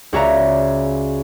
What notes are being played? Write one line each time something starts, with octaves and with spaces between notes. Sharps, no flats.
C#2 F#4 C#5 D5 E5 A#5